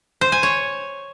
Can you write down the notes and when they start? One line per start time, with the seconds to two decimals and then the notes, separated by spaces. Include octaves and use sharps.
0.21 C5
0.32 G#5
0.43 C#5